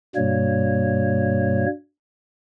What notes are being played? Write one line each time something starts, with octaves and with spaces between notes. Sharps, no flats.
G2 B2 G3 A#3 C#5